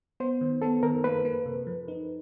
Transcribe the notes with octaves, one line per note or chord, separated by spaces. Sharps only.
B3 C5
D#3
B3 A4
D#3 A#4
A#3 B4
A#3
C3
F3
D#4